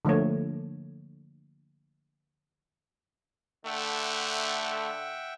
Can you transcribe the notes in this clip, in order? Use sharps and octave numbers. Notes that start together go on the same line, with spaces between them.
D3 F3 A3 A#3 C#5
D3 A3 E5 F#5 G5